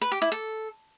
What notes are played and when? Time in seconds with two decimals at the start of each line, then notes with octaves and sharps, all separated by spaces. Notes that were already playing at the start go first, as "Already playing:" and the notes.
0.01 B4
0.12 G4
0.22 E4
0.32 A4